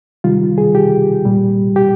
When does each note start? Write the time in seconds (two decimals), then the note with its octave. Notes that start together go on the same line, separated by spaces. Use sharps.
0.24 C3 D#3 G3 F4
0.58 G#4
0.75 G4
1.25 A#2 G3
1.76 G4